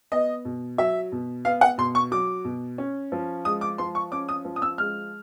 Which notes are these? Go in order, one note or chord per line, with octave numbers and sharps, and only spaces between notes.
B3 D#5
B2
F#3 E5
B2
B3 F5
F#5
B2 C6
C#6
F#3 D6
B2
C#4
F3
G#3 D#6
D6
F3 C6
C#6
C#4 D6
D#6
F3
D#6
E6
G#3 F6